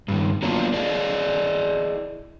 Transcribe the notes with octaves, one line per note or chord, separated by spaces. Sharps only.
G2 D#3
F#3 A#3 B3 D4 F4
E4 G#4 D5 D#5 F5